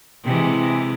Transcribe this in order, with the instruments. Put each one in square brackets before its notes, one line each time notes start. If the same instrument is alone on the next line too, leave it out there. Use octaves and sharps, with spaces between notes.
[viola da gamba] C3 E3 G#3